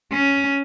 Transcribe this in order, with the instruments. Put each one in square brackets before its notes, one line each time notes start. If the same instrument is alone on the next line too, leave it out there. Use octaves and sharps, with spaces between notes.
[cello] C#4